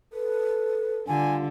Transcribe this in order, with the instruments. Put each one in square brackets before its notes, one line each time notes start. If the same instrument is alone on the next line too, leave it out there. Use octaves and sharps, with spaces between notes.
[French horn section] A4 [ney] B4
[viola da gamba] D3 [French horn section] G3 F4 [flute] G#5